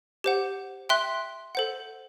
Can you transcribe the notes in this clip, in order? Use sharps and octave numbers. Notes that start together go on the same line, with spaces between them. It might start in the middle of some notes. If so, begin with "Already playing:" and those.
G4 C5 F#5
E5 G5 C6 F#6
A4 C5 F#5